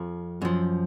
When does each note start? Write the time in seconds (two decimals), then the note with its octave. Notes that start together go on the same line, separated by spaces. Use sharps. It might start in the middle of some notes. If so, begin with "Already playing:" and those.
Already playing: F2 F3
0.41 F#2 F3